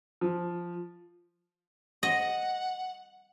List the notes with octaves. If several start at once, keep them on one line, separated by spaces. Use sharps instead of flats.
F3
D#5 F#5